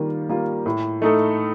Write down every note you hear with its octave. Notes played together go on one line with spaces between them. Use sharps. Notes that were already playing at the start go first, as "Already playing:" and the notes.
Already playing: D#3 G3 A#3 F4
G3 A#3 F4
A2
A3 D#4 A4